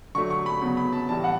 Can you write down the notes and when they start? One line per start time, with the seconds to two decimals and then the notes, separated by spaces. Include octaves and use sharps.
0.15 D3 F#3 A3 C#6
0.30 C#6
0.46 B5
0.62 C#3 F#3 B3
0.77 B5
0.93 A5
1.09 A2 E3 G3 A5
1.24 F#5